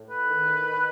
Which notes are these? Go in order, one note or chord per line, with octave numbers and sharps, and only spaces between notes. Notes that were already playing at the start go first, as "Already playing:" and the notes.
Already playing: A2
B4
D#3
D#3